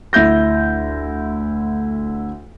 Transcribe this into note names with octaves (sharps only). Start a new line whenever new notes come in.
D2 E4 G6 A#6